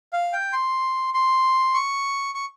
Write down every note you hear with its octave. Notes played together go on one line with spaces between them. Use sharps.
F5
G5
C6
C6
C#6
C#6